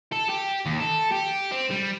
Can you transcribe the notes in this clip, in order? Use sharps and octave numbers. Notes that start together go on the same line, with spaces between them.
A4
G4
D#2
A4
G4
C4
G3